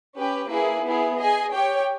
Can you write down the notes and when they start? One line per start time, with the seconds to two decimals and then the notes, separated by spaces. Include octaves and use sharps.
0.15 C#4 G4 B4
0.49 A#3 E4 G#4 B4
0.84 B3 E4 G#4
1.17 G#4 D#5 G#5
1.51 G4 C#5 G5